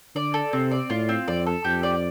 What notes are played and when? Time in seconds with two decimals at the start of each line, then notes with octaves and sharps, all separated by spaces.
0.15 D3 D5
0.34 A4
0.53 C3 C4
0.71 D5
0.90 A2 F4
1.09 C4
1.28 F2 D5
1.46 A4
1.65 F2 G4
1.83 D5